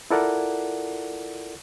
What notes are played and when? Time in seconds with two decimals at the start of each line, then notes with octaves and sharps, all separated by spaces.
0.11 E4 F4 A4 A#4 D5 F#5